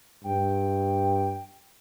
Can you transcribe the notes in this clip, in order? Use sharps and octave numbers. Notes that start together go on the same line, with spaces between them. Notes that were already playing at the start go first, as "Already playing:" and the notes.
G2 G5